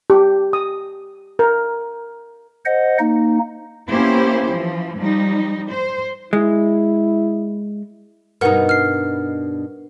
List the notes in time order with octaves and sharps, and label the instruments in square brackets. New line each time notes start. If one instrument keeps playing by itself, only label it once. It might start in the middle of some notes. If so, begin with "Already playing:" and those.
[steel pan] G4
D#6
A#4
[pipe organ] C5 D#5 F#5
A#3 D#4
[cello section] A#3 B3 C#4 E4 G4 C5
E3 F3
F3 G3 D#4
C5
[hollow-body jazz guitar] G#3 [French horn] E4
[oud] G2 B2 D#4 [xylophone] A#4 B4 F#5
[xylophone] F6 C7